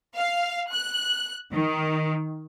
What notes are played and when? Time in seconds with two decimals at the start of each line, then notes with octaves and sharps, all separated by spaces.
0.14 F5
0.71 F#6
1.51 D#3